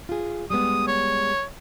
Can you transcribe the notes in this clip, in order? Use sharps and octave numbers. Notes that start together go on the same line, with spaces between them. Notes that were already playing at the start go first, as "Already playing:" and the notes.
F4 G#4
G3 G#3 B3 D#6
C#5